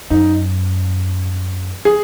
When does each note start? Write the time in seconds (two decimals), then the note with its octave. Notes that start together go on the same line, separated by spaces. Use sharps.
0.10 F#2 D#4
1.85 G#4